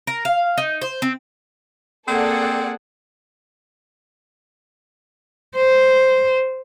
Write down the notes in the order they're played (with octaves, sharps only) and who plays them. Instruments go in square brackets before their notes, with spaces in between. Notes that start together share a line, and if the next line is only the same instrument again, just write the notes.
[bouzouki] A#4
F5
D#4
C5
C4
[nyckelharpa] A#3 G#4 [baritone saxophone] C4 [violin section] A4 D5 F#5
[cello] C5